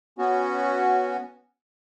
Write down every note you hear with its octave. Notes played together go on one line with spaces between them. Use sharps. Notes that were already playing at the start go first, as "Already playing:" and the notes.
B3 C#4 F#4